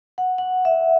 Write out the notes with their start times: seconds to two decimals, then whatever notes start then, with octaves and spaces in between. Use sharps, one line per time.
0.18 F#5
0.38 F#5
0.65 E5